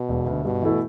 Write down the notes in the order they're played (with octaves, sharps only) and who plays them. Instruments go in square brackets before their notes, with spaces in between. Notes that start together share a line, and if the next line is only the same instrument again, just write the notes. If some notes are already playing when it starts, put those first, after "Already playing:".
Already playing: [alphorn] B2
[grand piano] E1
D2 D3
[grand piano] G2 [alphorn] B2
[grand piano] E3 A3 E4